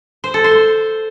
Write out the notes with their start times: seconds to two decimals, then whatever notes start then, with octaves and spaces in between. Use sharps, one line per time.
0.24 C5
0.34 A4
0.44 C5